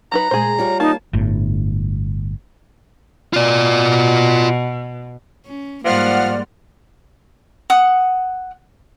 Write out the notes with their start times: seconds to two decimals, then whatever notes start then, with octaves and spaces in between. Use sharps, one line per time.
0.12 F#3 D#4 B4 A#5
0.31 A#2 G#3 G#4 C5
0.58 G3 F4 C#5
0.80 A#3 D#4 A5
1.13 G1 A2
3.33 B2 F4 D5
5.45 C#4
5.85 G#2 F3 G3 A#3 D5 F#5 C6 F6
7.70 F#5 D#6